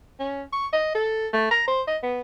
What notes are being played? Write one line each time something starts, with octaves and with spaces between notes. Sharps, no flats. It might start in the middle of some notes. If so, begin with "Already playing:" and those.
C#4
C#6
D#5
A4
A3
A#5
C5
D#5
B3